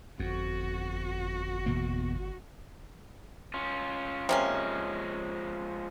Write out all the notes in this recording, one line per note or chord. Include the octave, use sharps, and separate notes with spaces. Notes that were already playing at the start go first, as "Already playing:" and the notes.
G1 F2 F#4
E2 B2 A#3
C#4 F4
C3 F3 G#3 A#3 C#4